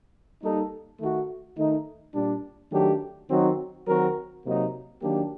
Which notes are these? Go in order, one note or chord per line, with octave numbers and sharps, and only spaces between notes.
G3 A#3 D#4 A4
D#3 A3 D#4 F#4
D#3 A3 D#4
A#2 G3 D4
D#3 F#3 A3 D4 G4
D#3 F#3 C4 D#4 F#4
D#3 F#3 C4 F#4 A#4
C3 F#3 A#3 D#4
D#3 F#3 A#3 D4 G4